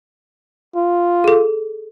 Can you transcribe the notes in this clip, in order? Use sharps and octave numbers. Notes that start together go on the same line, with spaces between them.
F4
G#4 A4